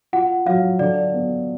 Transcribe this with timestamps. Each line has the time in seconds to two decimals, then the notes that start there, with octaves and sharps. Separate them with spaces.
0.13 F4 F#5
0.46 F#3 F5
0.79 D3 D5
1.13 B3